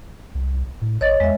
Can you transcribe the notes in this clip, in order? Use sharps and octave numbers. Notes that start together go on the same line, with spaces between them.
C2
A2
A1 C#5 D#5 A6
E2 G#3 E5